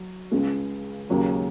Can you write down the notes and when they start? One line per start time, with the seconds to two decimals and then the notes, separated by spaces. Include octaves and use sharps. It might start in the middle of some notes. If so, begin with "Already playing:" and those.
Already playing: F#3 F#4
0.32 C#2 C#3 G#3
1.09 D#2 C#3 F#3 C#4 A#4